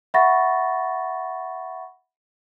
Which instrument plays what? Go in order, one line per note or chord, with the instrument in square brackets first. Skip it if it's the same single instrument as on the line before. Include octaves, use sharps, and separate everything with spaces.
[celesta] E5 F#5 B5 C#6 A6 A#6